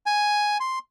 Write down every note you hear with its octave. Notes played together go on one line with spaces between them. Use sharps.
G#5
C6